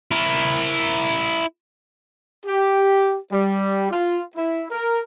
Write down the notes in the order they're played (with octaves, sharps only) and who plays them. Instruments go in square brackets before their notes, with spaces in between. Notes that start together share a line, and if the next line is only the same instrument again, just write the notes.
[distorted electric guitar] E4 A#4
[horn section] G4
G3
F4
E4
A#4